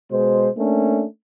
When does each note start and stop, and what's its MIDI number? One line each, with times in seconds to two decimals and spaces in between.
0.11 0.48 47
0.11 0.48 56
0.11 0.48 72
0.56 1.04 57
0.56 1.04 58
0.56 1.04 61
0.56 1.04 62